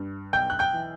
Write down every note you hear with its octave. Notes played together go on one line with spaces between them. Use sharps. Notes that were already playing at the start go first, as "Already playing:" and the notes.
Already playing: G2
B1 G5 G6
F#6
G5 G6
E3